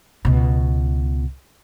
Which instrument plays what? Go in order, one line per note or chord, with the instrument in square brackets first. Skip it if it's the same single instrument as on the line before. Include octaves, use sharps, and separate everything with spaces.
[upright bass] C#2 B2